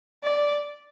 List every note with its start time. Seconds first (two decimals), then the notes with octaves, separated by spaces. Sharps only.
0.24 D5